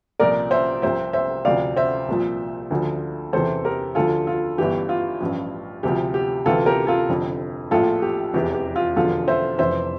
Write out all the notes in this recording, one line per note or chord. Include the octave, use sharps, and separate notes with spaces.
C2 A#2 F3 A#4 D5
C5 E5
C2 C3 F3 C5 E5
C5 E5
D2 C3 F3 D5 F5
C5 E5
C2 A#2 F3
D2 D3 F3
E2 C3 E3 A4 C5
G4 A#4
D2 D3 F3 F4 A4
F4
G1 G2 E3 G4
F4
A1 G2 F3
D2 C3 F3 G4
G4
D2 C3 E3 F4 A4
G4 A#4
F4 A4
F1 F2 D3 F3
A#1 A2 F3 F4 A4
G4
F1 E2 E3 G4
G4
F4
E1 E2 D3 F3 F4 A4
C5 E5
F1 F2 E3 C5 E5